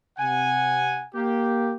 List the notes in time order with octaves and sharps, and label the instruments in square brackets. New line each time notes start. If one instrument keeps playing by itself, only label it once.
[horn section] C3 F#5 G#5
A#3 G4